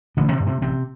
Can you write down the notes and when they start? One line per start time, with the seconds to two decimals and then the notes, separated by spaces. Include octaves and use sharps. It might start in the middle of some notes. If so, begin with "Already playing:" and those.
0.17 A1 D3 D4
0.32 C3 C4
0.40 G2 D3
0.47 C3 C4
0.61 A1 C3 C4